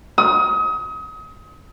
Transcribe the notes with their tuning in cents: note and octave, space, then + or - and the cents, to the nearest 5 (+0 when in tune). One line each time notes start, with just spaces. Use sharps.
D#6 +35